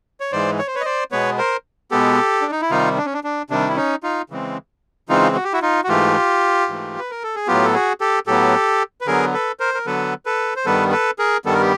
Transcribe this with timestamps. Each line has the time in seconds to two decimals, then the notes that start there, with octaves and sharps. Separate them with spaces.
0.20 C#5
0.32 G#2 E3 G#3 C5 D5
0.59 C#5
0.67 C5
0.75 B4 C#5
0.81 D#5
0.85 C5 D5
1.12 B2 G#3 B3 B4 C#5
1.38 A#4 C5
1.91 B2 G#3 B3 G4 A4
2.41 D4
2.52 D#4
2.62 E4
2.71 C3 D#3 G3 D#4 F4
2.98 D4
3.05 C#4
3.14 D4
3.24 D4
3.50 C3 D#3 G3 D4
3.69 E4
3.76 C#4 D#4
4.03 D#4 F4
4.30 C#3 E3 G#3 C4
5.09 C#3 E3 G#3 C4 D#4 F4
5.36 F#4
5.44 G4
5.53 E4 F#4
5.62 D#4 F4
5.84 F#4
5.89 G#2 E3 A3 F4 G4
6.68 G#2 E3 A3
6.99 B4
7.11 A#4
7.23 A4
7.35 G#4
7.47 A2 F#3 B3 F4 G4
7.64 A4
7.74 F#4 G#4
8.01 G4 A4
8.27 A2 F#3 B3 G4 A4
9.01 B4
9.07 D3 F#3 B3 G#4 A#4
9.33 A4 B4
9.60 A#4 C5
9.74 A#4
9.86 D3 F#3 B3 A4 B4
10.26 A4 B4
10.56 C5
10.66 G2 D#3 G3 B3 A4 B4
10.92 A4 B4
11.19 G#4 A#4
11.45 G2 D#3 G3 B3 A4
11.54 A#4
11.62 G4